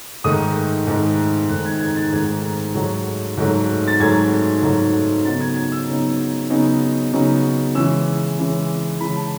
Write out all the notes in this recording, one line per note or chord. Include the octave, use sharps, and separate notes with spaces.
G#2 D#3 A3 D#4 D#6
G#2 D#3 A3 D#4
G#2 D#3 A3 D#4 F#6
G#6
G#6
A6
G#2 D#3 A3 D#4 G#6
G#2 F#3 A3
G#2 F#3 A3
A6
G#2 F#3 A3 G#6
G#2 F#3 A3
C#3 F#3 B3 D#4 A6
G#6
G#6
E6
C#3 F#3 B3 D#4
C#3 F#3 B3 D#4
C#3 F#3 B3 D#4
C#3 E3 G#3 C#4 E6
C#3 E3 G#3 C#4
C#3 E3 G#3 C#4 B5
A5